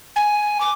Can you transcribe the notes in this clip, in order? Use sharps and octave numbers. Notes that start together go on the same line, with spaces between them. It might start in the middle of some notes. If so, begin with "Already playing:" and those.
G#5
D6